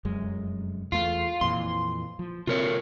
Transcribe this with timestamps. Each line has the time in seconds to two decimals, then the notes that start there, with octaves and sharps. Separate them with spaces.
0.05 F1 F#2 G#3
0.92 E2 A3 F4
1.41 F2 A#2 E3 C6
2.19 F3
2.47 C3 F4 A#4 C#5